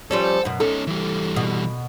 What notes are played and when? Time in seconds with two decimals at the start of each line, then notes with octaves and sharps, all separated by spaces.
0.11 F3 G3 C#4 A4
0.45 F#2 B2
0.60 C#4 D#4 A4
0.87 E3 G3
1.36 B2